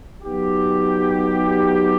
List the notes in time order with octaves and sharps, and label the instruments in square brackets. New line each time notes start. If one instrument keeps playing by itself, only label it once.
[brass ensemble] F#3 B3 D#4 G4